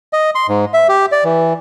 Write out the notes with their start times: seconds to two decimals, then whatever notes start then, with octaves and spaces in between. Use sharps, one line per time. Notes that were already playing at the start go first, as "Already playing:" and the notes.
0.13 D#5
0.35 C6
0.48 G#2
0.74 E5
0.89 G4
1.12 D5
1.24 E3